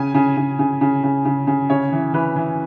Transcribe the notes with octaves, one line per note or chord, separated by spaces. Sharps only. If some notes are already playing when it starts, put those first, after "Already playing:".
Already playing: C#3 G#5
C#3
C#3
C#3
C#3
C#3
C#3
C#3
C#3 C#5
E3
E3 B4
E3